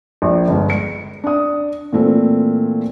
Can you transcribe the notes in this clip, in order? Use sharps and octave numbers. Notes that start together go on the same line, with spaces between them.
A#1
G1 G2 G#3
C#7
D4 D#6
A#2 E3 A3 C4